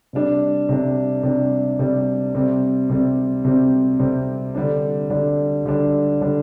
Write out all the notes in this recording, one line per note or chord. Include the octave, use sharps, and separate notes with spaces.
C3 G3 D4
C3 G3 D4
C3 G3 D4
C3 G3 D4
C3 G3 C4
C3 G3 C4
C3 G3 C4
C3 G3 C4
D3 G3 D4
D3 G3 D4
D3 G3 D4
D3 G3 D4